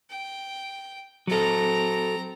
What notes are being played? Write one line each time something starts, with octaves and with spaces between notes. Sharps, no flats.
G5
F#3 C4 A4 A#5